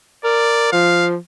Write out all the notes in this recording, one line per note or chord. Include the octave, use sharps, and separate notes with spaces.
A#4 D5
F3 F5